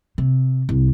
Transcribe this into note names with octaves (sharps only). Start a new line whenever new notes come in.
C3
C2